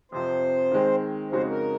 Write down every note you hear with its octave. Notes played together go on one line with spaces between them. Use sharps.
F2 C3 F3 C5
D#3 G#3 C4
F2 C#3 G#3 D#4 F#4 C5
A#4